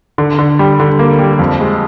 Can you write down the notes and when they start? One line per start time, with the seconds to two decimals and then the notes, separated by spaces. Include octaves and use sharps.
0.18 D3
0.39 D3
0.59 G3
0.80 D3
0.99 A#3
1.19 G3
1.39 F2
1.60 G#3